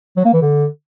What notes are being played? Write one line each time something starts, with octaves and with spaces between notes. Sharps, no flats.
F#3
A#3
E3
D3